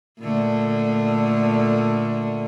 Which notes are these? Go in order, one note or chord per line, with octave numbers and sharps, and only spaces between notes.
A#2 D3 A3